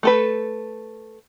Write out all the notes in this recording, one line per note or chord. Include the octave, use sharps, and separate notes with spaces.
A3 A4 B4